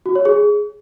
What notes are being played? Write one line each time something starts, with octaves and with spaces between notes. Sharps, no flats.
F#4
C#5
G#4